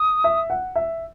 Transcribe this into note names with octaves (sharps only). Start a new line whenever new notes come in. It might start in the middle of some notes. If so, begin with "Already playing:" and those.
Already playing: D#6
E5
F#5
E5